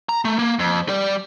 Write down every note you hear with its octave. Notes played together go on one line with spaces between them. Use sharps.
A#5
A3
A#3
F2
G3 D5